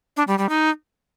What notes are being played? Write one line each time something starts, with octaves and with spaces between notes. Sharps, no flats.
D4
G3
G3
D#4